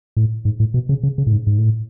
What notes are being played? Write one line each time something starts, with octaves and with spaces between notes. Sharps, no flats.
A2
G#2
A2
B2
C#3
C#3
C#3
A2
G#2
G#2
A2